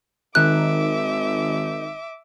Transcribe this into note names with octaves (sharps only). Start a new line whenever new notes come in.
G#1 D#3 D#4 E5 D6 F#6